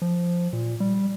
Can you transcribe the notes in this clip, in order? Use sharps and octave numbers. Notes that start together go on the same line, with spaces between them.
F3
A#2
G3